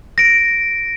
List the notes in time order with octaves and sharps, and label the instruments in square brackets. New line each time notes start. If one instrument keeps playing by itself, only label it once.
[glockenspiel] A#6 D7